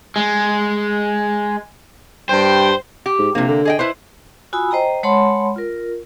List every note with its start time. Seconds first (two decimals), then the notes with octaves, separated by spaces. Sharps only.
0.16 G#3
2.29 G2 G3 C5 G5
3.06 G4
3.19 G#2
3.35 A#1 C3 A#3
3.48 D3
3.65 G#4 D#5 G5
3.79 E4 B4 C5
4.53 F4 F#4 G#5 B5 D#6 E6
4.71 C5 D#5 G5 A#5
5.03 G#3 C#5 F#5 A5 B5 C6
5.56 F4 A#4